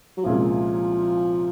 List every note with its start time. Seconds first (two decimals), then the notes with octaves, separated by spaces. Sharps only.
0.17 F#3
0.24 C2 A#2 F3 G#3 C#4